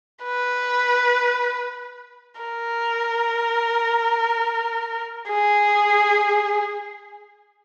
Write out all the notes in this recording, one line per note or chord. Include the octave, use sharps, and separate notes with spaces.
B4
A#4
G#4